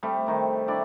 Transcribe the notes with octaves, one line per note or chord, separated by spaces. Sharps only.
G3 A3 C4
C3 D#3 G3
G3 D4 E4 D5